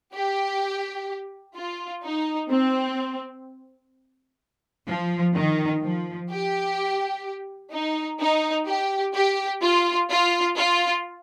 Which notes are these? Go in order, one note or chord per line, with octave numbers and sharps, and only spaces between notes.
G4
F4
D#4
C4
F3
D#3
F3
G4
D#4
D#4
G4
G4
F4
F4
F4